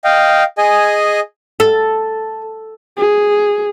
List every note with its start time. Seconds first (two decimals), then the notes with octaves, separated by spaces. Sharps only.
0.04 D#5 F5 G5
0.58 G#4 D#5 G#5
1.60 A4
2.97 G#4